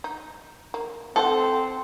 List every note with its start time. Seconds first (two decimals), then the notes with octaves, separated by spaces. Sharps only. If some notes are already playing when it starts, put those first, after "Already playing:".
0.04 D#4
0.74 A#3
1.16 C4 E4 A4 C5 F#5